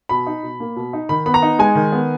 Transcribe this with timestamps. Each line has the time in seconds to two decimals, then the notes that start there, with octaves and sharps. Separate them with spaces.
0.09 B2 B5
0.26 D#4
0.43 B2
0.60 A#3
0.76 B2
0.93 D#4
1.09 D#3 B5
1.26 B3 B5
1.34 A#5
1.42 D#4
1.59 G#3 G#5
1.75 D#3
1.92 B3